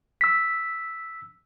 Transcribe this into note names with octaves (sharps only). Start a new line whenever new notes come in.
E6 B6